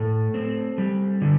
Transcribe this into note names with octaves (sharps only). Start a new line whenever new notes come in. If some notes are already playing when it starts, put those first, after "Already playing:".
Already playing: A2 A3 A4
C4
G3
D3